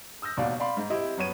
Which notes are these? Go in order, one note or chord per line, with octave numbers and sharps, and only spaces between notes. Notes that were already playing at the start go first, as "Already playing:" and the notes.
D#6 E6 G6 A#6
E1 D#2 B2 D5 F5
D5 F5 B5 C6
G#2
C4 E4 G4 C5 D#5
F#2 B3 C#5 D#7